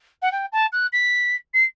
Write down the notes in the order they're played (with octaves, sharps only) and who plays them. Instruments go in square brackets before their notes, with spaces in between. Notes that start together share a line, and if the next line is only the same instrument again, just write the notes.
[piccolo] F#5
G5
A5
F#6
B6
C7